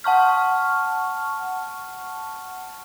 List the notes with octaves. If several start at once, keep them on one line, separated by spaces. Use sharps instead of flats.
F#5 A5 C#6 F6